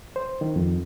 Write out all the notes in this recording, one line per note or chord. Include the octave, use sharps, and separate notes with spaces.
C5
D#3
F2